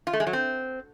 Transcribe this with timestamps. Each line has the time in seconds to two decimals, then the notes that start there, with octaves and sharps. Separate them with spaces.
0.07 F4
0.13 A3
0.20 G#3
0.27 F#3
0.33 C4